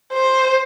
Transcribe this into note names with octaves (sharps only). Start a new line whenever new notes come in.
C5